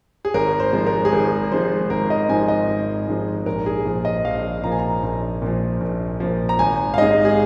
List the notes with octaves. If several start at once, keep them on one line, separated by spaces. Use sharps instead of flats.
G#4
G#1 A#4
C5
G#2 F3 G#3
A#4
G#4
G#1 A#4
G#2 F3 G#3 C5
G#1 A#4
D#5
G#2 F3 G#3 G#5
D#5
G#1
G#2 F3 G#3
A#1 A#4
G#4
A#2 F3
D#5
A#1 F5
A#2 F3 A#5
G#5
A#5
A#1
A#2 F3
A#1
A#2 F3
A#5
G#1 G#5
F5
G#2 G#3 D#5
G#4